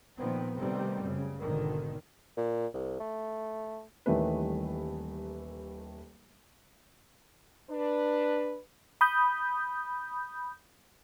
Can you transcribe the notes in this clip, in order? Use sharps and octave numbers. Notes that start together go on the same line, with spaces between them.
A#2 D#3 F3 B3 C4
C3 D#3 G3 A3 B3 C4
F#2 C#3
G#1 B2 D3 D#3
A#2
C2
A3
D#1 D#3 E3 G3 A3 B4
D4 B4
B5 D#6 G6